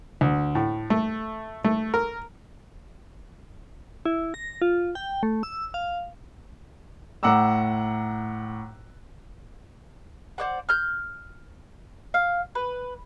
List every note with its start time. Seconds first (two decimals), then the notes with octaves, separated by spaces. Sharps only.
0.21 D2
0.55 A2
0.90 A3
1.64 A3
1.94 A#4
4.05 E4
4.34 A#6
4.62 F4
4.95 G5
5.23 A3
5.43 E6
5.74 F5
7.23 A2 F#5 A#5 D6 E6
10.38 C5 D5 F#5
10.69 F6 G6
12.14 F5
12.55 B4